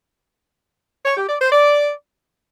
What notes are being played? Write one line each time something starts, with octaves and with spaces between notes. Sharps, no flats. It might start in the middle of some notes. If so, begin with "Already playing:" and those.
C#5
G4
D5
C5
D5